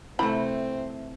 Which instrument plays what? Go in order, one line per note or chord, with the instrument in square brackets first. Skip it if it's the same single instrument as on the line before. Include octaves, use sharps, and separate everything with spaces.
[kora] C3 E3 A3 [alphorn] C4 [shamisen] E4 B5